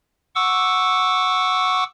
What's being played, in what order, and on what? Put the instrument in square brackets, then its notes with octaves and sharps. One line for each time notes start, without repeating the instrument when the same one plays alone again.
[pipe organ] F#5 C#6 D6 E6